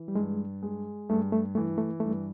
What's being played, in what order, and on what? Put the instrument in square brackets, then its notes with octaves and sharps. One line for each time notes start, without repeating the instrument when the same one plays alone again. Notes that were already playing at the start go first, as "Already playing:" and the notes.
Already playing: [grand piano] E3
[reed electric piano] G3
[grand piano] G2 [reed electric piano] G#3
[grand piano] G#3
[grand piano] G2 [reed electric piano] A3
[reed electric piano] A3
[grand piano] E3 [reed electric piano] A3
[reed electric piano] A3
[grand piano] G2 [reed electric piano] A3